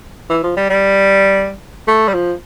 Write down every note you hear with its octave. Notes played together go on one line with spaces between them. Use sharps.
E3
F3
G3
G3
A3
G3
F3